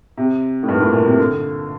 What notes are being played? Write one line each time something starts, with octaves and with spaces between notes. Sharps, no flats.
C3
A2
G2
A#2
A2
A#2
C3
D3